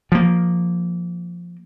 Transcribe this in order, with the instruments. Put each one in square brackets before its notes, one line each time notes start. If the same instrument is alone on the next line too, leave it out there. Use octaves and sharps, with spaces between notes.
[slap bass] F3 A#3